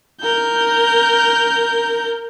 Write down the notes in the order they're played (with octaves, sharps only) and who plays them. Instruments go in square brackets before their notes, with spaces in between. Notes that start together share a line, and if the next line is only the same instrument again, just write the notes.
[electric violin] A#4 G6